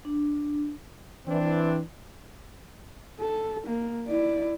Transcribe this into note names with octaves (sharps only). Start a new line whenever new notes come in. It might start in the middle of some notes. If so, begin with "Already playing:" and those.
D4
E3 C4 D4
A4
A#3
E4 D5